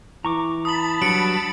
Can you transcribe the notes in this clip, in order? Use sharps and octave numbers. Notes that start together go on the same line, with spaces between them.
E3 A#5 C#6 D6
A5 B5 D#6 F#7
G2 F#3 C#7 D7 F#7